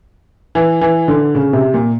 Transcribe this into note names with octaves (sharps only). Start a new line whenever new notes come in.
E3
E3
D3
C#3
C3
A#2